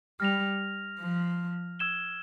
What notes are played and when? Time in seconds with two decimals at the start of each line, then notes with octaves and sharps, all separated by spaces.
0.20 G3 F6 A#6 F7
0.99 F3
1.79 E6 G#6 E7 G7